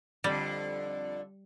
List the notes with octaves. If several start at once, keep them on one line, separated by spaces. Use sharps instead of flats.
F2 D3 G3